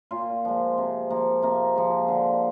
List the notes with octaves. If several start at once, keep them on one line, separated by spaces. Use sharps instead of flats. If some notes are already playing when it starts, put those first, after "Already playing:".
A#2 F4
F3 G#3
C3
F3 A#3
C3 A#3
F3 G#3
D3